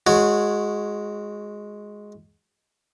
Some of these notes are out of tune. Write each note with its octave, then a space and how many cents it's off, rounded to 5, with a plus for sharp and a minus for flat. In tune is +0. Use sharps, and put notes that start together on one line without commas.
G#3 +0 F#4 -20 C#5 +0